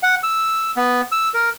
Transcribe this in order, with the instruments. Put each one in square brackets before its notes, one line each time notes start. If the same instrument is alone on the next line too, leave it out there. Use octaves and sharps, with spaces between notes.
[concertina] F#5
E6
B3
E6
A#4